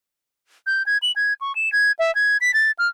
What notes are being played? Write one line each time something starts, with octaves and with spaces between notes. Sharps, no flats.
G6
G#6
F#7
G#6
C#6
E7
G#6
E5
G#6
B6
A6
F6